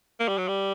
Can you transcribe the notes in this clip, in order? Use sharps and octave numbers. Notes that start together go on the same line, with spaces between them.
A#3
G3
F#3
G3